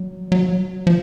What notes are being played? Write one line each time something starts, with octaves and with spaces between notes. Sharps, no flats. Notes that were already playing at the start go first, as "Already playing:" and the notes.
Already playing: F#3
F#3
F3